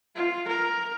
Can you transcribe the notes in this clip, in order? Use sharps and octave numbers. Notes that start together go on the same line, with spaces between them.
F4
A#4